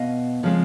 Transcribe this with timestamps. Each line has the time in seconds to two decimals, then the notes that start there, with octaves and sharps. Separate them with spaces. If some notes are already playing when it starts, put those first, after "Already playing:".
Already playing: B2 B3 D#5 F5
0.43 C#3 F3 G#3 C4